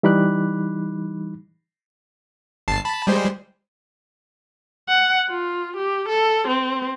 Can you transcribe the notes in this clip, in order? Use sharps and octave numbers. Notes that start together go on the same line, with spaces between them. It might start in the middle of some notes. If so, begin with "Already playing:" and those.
E3 G3 D#4 B5 D6 F#6
G1 A5 C7
A5 B5
G3 G#3 C5
F#5
F4
G4
A4
C4